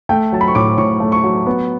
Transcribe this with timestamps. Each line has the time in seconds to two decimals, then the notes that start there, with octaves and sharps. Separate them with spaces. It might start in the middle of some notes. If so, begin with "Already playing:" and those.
0.09 A3 G5
0.32 F#3 A5
0.41 B5
0.48 C#6
0.55 A2 D6
0.78 A2 C#6
1.00 A3
1.12 C#6
1.24 F#3
1.46 B3